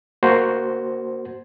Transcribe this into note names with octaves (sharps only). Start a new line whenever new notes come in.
A#3 F#4 C5